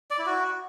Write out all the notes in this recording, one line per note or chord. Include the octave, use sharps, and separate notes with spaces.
D5
E4
F#4